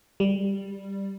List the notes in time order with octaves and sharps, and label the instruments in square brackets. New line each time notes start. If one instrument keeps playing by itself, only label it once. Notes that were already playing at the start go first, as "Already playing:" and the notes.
[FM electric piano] G3